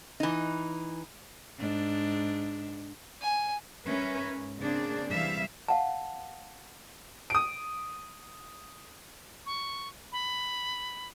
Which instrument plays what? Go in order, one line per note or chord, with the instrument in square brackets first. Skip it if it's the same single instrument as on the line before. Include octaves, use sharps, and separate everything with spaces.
[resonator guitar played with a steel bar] E3 D#4
[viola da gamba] G#2 D4
[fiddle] G#5
[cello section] G3 C#4 A#4 B4 E5
G#2
C#3 A#3 C4 D4 G#4 D5
C3 E3 G3 E5 F5
[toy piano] F5 F#5 A5
[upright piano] D#6 D7
[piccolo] C#6
B5